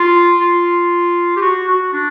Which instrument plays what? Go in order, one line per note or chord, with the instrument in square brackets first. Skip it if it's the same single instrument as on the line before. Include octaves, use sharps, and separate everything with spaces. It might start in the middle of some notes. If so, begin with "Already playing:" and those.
Already playing: [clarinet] F4
F4
G4
F#4
F#4
D4